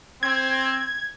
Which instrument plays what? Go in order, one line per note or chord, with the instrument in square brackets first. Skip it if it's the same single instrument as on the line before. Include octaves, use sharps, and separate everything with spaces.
[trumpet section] C4 [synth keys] G#6